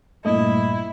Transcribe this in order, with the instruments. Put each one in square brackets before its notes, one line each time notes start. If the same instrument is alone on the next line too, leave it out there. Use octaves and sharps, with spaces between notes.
[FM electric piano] G2 A#2 [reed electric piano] A3 D#5 [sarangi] E4